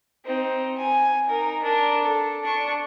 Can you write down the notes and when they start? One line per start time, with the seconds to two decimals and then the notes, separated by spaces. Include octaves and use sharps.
0.25 C4 D#4
0.78 G#5
1.26 D#4 A#4
1.62 D4 A#4
2.02 A4
2.43 D4 C#6